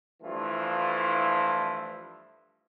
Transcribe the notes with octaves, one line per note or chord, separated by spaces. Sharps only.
G2 E3 F3 A3 E4 F4